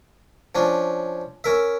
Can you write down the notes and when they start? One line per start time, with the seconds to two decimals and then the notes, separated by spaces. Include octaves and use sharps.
0.55 F3 C#4 D4
1.44 C#4 A#4 E5